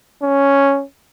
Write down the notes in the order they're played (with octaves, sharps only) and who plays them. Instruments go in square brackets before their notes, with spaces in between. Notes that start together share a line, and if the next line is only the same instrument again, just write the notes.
[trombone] C#4